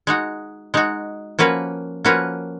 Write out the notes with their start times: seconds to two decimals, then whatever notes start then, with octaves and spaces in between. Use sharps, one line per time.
0.07 G#3 D#4 F#4
0.74 G#3 D#4 F#4
1.39 F3 A#3 C#4 F#4 B4
2.05 F3 A#3 C#4 F#4 B4